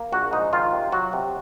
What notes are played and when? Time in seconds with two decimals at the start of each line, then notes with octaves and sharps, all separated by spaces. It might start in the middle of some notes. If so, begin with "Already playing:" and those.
Already playing: A#3
0.12 A#1 F#4
0.33 G#2 D#4
0.53 D#3 F4
0.73 C3
0.92 F#3 F#4
1.13 C3